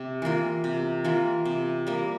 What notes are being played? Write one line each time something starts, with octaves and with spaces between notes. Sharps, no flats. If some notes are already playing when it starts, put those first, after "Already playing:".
Already playing: C3
E3 A#3 F4
C3
E3 A#3 F4
C3
G3 A#3